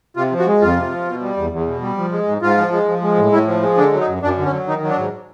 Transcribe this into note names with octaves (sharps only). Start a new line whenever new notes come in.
C3 F4
F3
F#4
G#3
F2 F4
C3
F3
B2
G3
E2
E2
B2
G3
F3
G#3
G#2
G#2 F4
F3
G#3
F3
G#3
A2
A2 E4
F3
G#3
D3 D4
F#3
D#4
F#2
F#2 D4
D3
C#4
F#3
D#3 D#4
F#3
D4
G#2